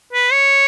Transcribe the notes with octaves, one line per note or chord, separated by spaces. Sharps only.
B4
C#5